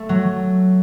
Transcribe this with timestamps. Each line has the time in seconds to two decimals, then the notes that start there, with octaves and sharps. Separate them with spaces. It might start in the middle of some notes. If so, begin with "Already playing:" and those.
Already playing: A3
0.09 F#3